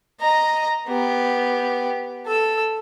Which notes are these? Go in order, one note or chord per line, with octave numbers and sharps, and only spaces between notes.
D#5 A#5
B3 G4
A4 E6